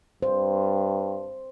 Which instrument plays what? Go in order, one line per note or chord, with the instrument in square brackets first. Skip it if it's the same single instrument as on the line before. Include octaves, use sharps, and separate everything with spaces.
[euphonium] G2 [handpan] C5